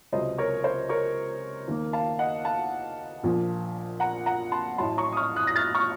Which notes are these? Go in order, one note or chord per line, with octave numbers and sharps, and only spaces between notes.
C#2 C3 F#3 C5 D#5
A#4 C#5
C5
A#4 C#5
D#2 D#3 A#3
F5 A5
D#5 F#5
F5 A5
A#1 A#2 F3
F#5 A#5
F#5 A#5
A5 C6
A1 A2 F#3 A5 C6
A#5 C#6
D#6
C#6 F6
D#6 F#6
A#6
F6 A6
C#6 F6